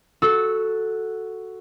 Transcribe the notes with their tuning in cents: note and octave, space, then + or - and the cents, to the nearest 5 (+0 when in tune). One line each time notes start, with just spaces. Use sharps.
F#4 +0 A4 +0 E6 -20